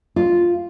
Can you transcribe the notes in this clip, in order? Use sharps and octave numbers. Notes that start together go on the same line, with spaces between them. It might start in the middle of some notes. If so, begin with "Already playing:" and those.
F4